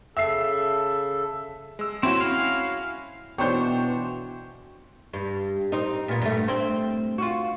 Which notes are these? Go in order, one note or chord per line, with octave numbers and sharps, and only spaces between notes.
C#3 A4 E5 C7
G#3 E6
C4 C#4 E4 F#4
F5
B2 E3 D4 C5 C#5 G5 C#6 G6
G2
C4 D#4
A#2 B3
G2 A3
C4
F4 F#4